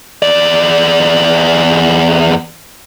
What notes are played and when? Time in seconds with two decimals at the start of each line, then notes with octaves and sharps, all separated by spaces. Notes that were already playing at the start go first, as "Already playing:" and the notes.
0.22 E2 D5